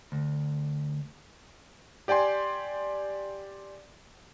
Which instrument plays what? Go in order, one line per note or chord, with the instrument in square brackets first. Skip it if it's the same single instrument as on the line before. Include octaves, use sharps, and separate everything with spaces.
[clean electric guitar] D2
[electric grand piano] G4 D5 G5 G#5 C6